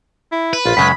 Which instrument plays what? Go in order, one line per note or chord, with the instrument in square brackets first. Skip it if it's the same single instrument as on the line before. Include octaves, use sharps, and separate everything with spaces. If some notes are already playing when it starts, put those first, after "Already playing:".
[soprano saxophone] E4
[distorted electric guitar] B4
[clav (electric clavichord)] A#1 [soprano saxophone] F4
[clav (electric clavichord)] F#2 C#3 G#3 [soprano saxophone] B5